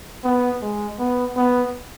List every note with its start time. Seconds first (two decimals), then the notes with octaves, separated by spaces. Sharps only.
0.23 B3
0.61 G#3
0.99 B3
1.36 B3